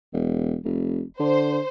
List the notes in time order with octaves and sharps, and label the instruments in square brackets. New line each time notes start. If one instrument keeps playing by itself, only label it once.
[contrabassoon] E1
F1
[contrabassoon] D3 [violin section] C5